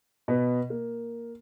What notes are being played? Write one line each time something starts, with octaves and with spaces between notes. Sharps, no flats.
B2 B3
A#3